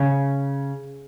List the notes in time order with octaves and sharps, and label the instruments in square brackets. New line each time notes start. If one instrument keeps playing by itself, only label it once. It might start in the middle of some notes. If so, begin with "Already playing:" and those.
Already playing: [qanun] C#3